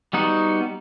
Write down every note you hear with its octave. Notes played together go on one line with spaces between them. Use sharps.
G3 B3 D#4 F#4